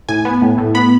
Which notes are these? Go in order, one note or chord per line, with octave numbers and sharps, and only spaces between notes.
A2 G#5
B3
A2
A2
B3 B5